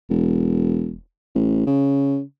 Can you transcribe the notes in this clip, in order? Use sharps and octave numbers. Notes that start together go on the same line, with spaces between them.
E1
A1
C#3